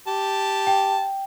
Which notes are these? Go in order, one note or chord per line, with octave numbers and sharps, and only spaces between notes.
G4 A5
G5